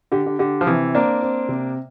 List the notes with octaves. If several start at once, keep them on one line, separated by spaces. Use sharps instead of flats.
D3 G4
D3
D3 G4
F3
C3 E3
A#3 C4 D4
C4
C3